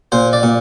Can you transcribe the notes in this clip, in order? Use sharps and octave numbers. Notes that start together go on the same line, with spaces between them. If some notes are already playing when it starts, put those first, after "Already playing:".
A#2 C5
D5
A#2